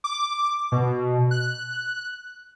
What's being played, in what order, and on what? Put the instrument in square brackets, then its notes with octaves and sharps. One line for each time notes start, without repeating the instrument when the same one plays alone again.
[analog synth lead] D6
B2
F#6